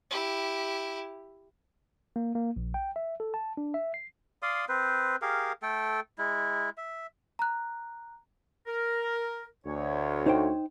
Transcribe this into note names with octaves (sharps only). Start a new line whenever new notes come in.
E4 G4
A#3
A#3
A#1
G5
E5
A4
A5
D4
E5
C7
D5 F5 C6 D#6
C4 B4 C5
G4 G#4 A#4 F5
A3 A4 G5
G#3 E4
E5
A#5 F#6
A#4
D2 C#5
D#4 C5 G5